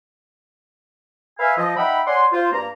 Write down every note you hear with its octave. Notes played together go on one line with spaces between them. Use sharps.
B4 E5 F5 G#5
F3 D#5
D#4 E5 F#5 G5 B5
C#5 D5 F#5 G#5 C6
F4 C5
G2 A#3 A#5